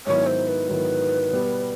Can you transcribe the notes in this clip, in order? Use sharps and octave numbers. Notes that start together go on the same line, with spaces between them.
G#2 D#3 F#3 B3 E4 C#5
C5
B4
G#2 D#3 F#3 B3 E4
B2 G3 B3